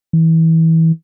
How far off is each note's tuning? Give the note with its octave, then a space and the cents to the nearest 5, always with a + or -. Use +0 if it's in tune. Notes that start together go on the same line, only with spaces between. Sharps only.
E3 -25